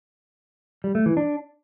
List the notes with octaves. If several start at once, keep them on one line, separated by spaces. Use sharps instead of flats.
G3
A3
E3
D4